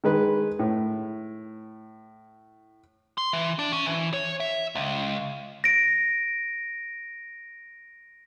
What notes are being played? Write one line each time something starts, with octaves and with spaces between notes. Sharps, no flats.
D#3 G#3 B4
A2
C6
E3
D4
C#4
E3
C#5
E5
C#2
A#6 D7